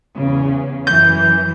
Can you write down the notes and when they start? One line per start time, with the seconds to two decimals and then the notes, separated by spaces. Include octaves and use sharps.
0.15 E2 C#3
0.87 F#2 E3 G6